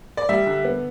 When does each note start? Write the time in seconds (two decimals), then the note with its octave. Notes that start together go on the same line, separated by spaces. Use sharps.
0.17 D5
0.29 G3 E5
0.46 D3
0.65 B3